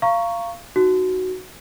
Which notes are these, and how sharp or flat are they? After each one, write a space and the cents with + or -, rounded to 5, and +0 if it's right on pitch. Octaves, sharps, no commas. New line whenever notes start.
F5 -20 A#5 -10 C#6 +0
D#4 +0 F#4 +0